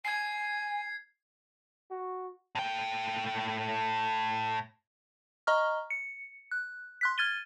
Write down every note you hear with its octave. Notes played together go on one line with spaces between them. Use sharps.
G#5 G#6 C7
F#4
A2 G5
D#5 A#5 C#6 F6
C#7
F#6
C6 F#6 B6
F6 G#6 A6 D#7 G7